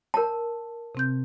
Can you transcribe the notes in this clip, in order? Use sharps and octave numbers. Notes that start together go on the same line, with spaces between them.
A#4 A5
C3 C4 G6